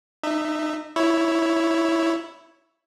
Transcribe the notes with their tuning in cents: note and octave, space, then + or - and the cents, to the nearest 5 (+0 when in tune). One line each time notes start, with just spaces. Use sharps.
D#4 -25 E5 +0
E4 +0 C#5 +10